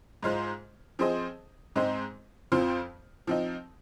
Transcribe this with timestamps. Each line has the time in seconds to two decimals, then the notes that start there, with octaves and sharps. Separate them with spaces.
0.23 G#2 G#3 F4 C5
0.99 F3 C4 G#4 C5 D#5
1.76 G#2 G#3 C4 D#4 C5
2.52 F2 F3 C4 F4 C5
3.27 F3 C4 D#4